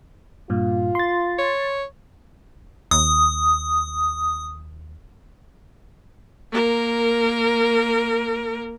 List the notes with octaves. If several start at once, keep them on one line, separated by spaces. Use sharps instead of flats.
G2 A#2 F4
C6 A6
C#5
D#2 D#6
A#3 A#4